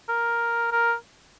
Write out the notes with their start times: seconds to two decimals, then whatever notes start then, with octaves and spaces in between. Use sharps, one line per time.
0.09 A#4
0.72 A#4